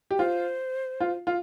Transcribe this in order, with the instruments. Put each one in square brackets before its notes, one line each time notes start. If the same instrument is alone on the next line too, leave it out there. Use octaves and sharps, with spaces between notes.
[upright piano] G4
[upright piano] F4 [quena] C5
[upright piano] F4
F4